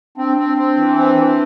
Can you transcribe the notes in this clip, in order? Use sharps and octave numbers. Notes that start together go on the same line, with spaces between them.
C4 D4
C4
C4
E3
C4
E3